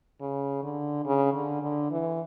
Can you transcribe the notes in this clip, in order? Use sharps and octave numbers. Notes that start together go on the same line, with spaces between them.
C#3
D3
C#3
D3
D3
E3